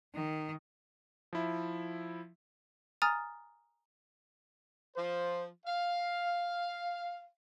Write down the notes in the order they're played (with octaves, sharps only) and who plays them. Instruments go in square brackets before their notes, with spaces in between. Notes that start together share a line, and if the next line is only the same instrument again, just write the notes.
[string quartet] D#3
[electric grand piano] F3 E4 E5
[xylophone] G#5 A#5 D#6 F6 A6
[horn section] F3 C5
F5